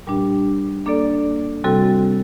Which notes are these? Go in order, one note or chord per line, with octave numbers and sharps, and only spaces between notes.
A#2 G3 D4 G4
A#3 D4 A4 D5
C3 G3 C4 F#4 A4